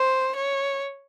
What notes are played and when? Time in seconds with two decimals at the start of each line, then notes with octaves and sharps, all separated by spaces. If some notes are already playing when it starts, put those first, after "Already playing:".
Already playing: C5
0.36 C#5